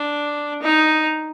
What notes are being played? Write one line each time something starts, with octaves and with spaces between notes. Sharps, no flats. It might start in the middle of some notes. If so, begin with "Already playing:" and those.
Already playing: D4
D#4